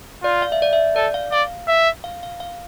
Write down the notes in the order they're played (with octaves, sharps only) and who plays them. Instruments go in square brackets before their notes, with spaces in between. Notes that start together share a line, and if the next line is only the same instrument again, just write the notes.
[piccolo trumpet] F4 [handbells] D5
[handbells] F5
E5
D5
E5
[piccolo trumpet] A4 [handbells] D5
[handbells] F5
[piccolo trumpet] D5 [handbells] F5
[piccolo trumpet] E5
[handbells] F5
F5
F5